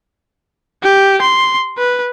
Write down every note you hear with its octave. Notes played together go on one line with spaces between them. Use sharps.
G4
C6
B4